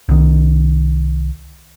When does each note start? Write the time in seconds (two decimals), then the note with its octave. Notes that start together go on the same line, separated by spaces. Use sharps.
0.09 C2 D#3